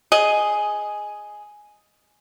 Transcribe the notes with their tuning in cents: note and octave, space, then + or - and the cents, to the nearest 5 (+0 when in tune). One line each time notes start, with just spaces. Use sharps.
G#4 +5 D#5 +0